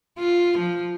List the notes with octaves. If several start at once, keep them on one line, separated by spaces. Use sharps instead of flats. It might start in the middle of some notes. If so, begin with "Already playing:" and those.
F4
F3